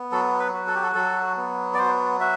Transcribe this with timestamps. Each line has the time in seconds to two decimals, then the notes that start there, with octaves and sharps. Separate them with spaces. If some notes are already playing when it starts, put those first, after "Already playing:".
Already playing: B3
0.12 F#3 A4
0.39 B4
0.53 F#4
0.67 A4
0.75 G4
0.83 A4
0.95 F#3 A4
1.37 B3
1.74 D5
1.79 F#3 C5
2.20 F#4 E5